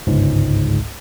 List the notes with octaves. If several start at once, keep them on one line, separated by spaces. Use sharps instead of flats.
G1 C#2 G#2